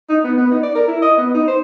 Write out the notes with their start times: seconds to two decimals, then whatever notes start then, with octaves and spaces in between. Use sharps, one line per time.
0.09 D#4
0.24 B3
0.38 B3
0.51 D#4
0.63 D5
0.75 A#4
0.88 E4
1.02 D#5
1.18 B3
1.35 D#4
1.48 C5